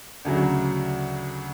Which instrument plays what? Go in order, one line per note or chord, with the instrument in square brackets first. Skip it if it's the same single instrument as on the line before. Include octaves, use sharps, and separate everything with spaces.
[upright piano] D2 C#3 F#3